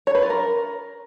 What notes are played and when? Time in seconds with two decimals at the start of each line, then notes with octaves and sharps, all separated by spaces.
0.07 C#5
0.15 B4
0.22 F4
0.30 A#4